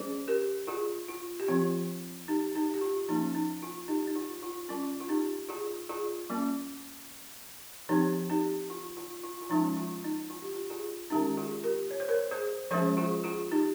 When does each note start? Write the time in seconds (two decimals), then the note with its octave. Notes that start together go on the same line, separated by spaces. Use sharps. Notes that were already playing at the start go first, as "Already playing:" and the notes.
Already playing: G3 C#4 G#4 C5
0.28 G4 A#4
0.67 F4 G#4
1.08 F4
1.40 G4
1.48 F3 C4 F4
2.28 D#4 G4
2.55 D#4 G4
2.74 G4
2.81 F4
3.08 F3 A#3 C#4 D#4
3.35 D#4
3.63 F4
3.88 D#4 G4
4.07 D#4
4.16 F4
4.43 F4
4.68 G3 C#4 F4
5.00 F4
5.09 D#4 G4
5.49 F4 G#4
5.89 F4 G#4
6.30 G3 A#3 C#4
7.89 F3 C4 D#4 G4
8.30 D#4 G4
8.70 F4
8.97 F4
9.23 F4
9.42 F4
9.50 F3 G#3 C#4 D#4
9.77 F4
10.04 D#4
10.30 F4
10.42 G4
10.53 F4
10.70 F4 G#4
11.10 D#3 G#3 C#4 D#4 G4
11.37 F4 G#4
11.64 G4 A#4
11.91 C#5
12.00 C5
12.08 A#4 C#5
12.31 G#4 C5
12.71 F3 G#3 C#4 G#4 C5
12.97 F4 G#4
13.24 F4 G#4
13.51 D#4 G4